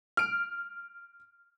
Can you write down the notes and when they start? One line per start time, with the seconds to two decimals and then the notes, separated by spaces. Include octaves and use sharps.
0.17 F6 D7